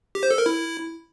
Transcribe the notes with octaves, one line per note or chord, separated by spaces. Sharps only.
G4
C5
A4
A#4
E4